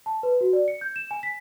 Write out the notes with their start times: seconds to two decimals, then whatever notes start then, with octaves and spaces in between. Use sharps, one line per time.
0.06 A5
0.23 B4
0.41 F#4
0.53 D5
0.68 C#7
0.81 G6
0.96 E7
1.11 G#5
1.23 B6